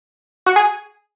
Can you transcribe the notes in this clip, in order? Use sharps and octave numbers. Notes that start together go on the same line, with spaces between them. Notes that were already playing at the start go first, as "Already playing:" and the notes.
F#4
G#4